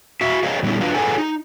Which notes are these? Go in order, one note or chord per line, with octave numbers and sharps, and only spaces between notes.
F#4 E5 F5
G#4 A#4 C5 C#5 D#5 F5
A#2 D3 G3 B3 C#4 E4
F#3 D4 F4 B4 F5
G#4 A4 B4 C#5 F#5 G#5
D#4